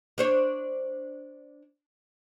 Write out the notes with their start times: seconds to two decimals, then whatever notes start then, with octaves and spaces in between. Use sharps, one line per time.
0.18 D4 C5 C#5